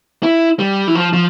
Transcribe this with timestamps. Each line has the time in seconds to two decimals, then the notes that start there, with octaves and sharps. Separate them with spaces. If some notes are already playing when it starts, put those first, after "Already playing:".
0.23 E4
0.59 G3
0.87 E3
0.95 F3
1.13 F3